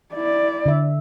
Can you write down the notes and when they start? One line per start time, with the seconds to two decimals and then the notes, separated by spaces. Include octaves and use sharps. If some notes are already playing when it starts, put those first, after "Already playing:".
0.13 E4 D5
0.66 D3 E5